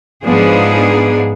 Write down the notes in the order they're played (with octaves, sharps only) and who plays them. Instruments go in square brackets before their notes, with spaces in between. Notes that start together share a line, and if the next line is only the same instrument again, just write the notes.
[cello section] G#2 F3 B3 D4 G#4